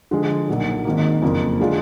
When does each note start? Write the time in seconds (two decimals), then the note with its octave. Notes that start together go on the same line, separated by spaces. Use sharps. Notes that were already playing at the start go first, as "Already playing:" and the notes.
0.11 D3 F3 G#3
0.48 B1 A#2 F#3 D4
0.85 G#1 G#2 D#3 A#3
1.22 F#1 F2 F3 A#3 D4
1.60 D3 G#3 D4 F4